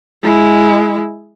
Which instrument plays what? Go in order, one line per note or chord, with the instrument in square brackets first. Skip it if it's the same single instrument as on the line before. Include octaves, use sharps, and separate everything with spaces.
[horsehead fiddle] G#3 E4